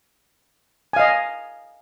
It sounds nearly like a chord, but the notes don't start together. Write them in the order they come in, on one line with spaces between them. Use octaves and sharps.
G#5 F5 D#5